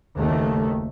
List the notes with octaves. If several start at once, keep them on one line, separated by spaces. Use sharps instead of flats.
F#1 D#2 D#3 A3